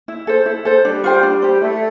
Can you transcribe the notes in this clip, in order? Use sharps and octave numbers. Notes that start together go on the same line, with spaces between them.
E4
A4 C5
E4
A4 C5
G3 D4
F4 C5 G5
D4
G4 C5
A3 E4